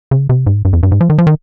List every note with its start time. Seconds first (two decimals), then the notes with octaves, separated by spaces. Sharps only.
0.11 C#3
0.29 C3
0.47 G#2
0.65 G2
0.73 F2
0.83 G2
0.92 G#2
1.01 F3
1.10 D#3
1.18 F3
1.27 D#3